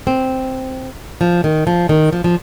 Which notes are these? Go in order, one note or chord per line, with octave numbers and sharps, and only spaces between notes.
C4
F3
D#3
F3
D#3
F3
F3